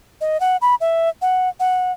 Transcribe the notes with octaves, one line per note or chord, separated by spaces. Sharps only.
D#5
F#5
B5
E5
F#5
F#5